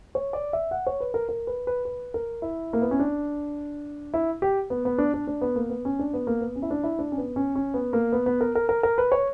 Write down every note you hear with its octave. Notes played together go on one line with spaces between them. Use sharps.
C#5
D5
E5
F#5
C#5
B4
A#4
A#4
B4
B4
B4
A#4
E4
A#3
B3
C#4
D4
E4
G4
B3
B3
D4
D4
D4
B3
A#3
B3
C#4
D4
B3
A#3
B3
C#4
E4
D4
E4
D4
C#4
B3
C#4
C#4
B3
A#3
B3
B3
A#4
A#4
A#4
A#4
B4
C#5